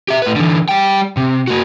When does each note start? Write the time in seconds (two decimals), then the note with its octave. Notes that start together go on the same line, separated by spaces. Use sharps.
0.08 G4 E5
0.22 A2 B4
0.36 D3 E3
0.69 G3 G5
1.17 C3
1.47 A#3 F#4